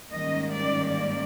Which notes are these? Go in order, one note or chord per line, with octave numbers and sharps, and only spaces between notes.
G#2 D#3 G3 A#3 C#4 D#5
D5
D5